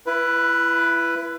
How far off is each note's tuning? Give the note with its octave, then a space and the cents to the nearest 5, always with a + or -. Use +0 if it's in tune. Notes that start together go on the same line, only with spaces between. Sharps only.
E4 +30 B4 +0